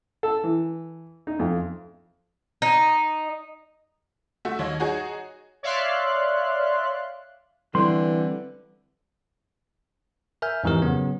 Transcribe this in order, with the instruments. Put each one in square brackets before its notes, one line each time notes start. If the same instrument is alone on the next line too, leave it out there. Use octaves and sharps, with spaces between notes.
[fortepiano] A4
E3
D#4
F2
[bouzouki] D#4
[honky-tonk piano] A3 F#4 E5
D#2 C#5 D#5
D#4 F#4 G#4 C#5 G#5
[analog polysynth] C#5 D5 E5 F5 C6 F#6
[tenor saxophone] D3 [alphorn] E3 [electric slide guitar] G3 C4 B4 [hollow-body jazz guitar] C6
[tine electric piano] A#4 E5 G#5 F6 G6
F2 G#2 E3 G4 A#4
C#3 F#3 B3